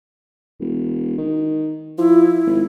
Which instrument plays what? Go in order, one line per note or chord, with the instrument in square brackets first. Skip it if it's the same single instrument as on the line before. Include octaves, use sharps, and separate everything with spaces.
[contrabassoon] E1
D#3
[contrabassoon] F3 [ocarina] E4
[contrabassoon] G#1